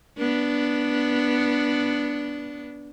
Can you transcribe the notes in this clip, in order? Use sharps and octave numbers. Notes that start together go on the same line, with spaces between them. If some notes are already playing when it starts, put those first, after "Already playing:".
B3 D4